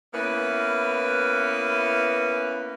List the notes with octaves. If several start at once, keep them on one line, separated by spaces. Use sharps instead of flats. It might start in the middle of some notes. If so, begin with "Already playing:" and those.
A#3 B3 C#4 E4 B4